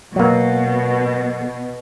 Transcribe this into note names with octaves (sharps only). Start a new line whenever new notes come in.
B2 F#3 A#3